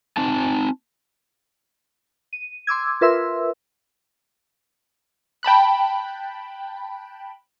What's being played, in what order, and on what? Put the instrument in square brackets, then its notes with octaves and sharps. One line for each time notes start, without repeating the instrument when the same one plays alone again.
[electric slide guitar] C4 D#4 A5
[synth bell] D#7
C6 D6 E6 G#6
F4 A#4 B4 E5 C6 E6
[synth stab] G5 A5 B5 F#6